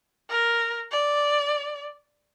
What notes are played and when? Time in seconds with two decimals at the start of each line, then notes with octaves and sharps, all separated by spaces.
0.30 A#4
0.92 D5